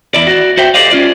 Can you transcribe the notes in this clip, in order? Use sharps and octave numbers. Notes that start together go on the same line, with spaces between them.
E2 E4 D5
F#4 D5
F#4 C5 E5 G5
G4 A4 C5 D5 D#5 F5
C#4 F4 D5